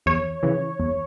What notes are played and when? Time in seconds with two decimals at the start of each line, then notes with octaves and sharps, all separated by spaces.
0.06 E2 C#5
0.43 C#3 E3
0.80 E2